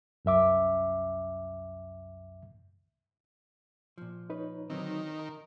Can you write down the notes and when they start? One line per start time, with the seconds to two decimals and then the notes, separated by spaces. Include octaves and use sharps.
0.25 C2 F#2 E5 D6
3.98 A#2 F3
4.30 D#4 B4 C#5
4.70 D3 D#3 F#3 C4
5.19 A#4